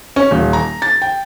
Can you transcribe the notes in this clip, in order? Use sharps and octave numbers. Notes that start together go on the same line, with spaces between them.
C#4
D#1
A#5
A6
G5